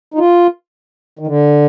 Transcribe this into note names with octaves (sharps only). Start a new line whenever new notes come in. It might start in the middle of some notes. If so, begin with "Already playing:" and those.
D#4
F4
D#3
D3